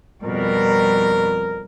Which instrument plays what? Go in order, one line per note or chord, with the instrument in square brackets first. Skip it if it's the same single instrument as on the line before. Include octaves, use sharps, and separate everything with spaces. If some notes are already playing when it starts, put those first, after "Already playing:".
[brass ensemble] F2 A#4 [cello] B2 G3